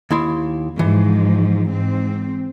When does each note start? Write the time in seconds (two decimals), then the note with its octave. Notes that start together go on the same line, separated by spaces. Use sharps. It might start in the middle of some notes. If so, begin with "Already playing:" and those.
0.11 D#2 E4 C6
0.79 G#2 E3 F3
1.71 G#2 C4